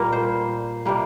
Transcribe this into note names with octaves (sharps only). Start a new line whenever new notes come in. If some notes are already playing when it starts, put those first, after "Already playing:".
Already playing: A#2 G3 A#3 A#4
C5
C3 G3 A#3